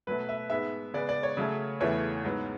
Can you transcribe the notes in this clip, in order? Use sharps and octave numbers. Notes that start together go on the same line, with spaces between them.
B2 F#3 A3 B4
E5
G#2 G#3 B3 E5
C#3 G#3 B3 D5
D5
C#5
C#3 F#3 A3
E2 C#3 E3 A3 C#5
G#2 F#3 B3